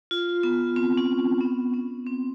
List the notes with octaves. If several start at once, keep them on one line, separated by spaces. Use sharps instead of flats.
F4
B3
C4
C#4
B3
B3
C4